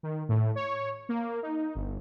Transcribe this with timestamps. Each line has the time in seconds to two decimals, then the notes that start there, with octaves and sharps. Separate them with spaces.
0.03 D#3
0.29 A2
0.55 C#5
1.09 A#3
1.43 D#4
1.75 G1